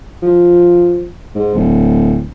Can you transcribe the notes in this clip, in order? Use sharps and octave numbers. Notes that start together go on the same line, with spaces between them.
F3
G#2
D1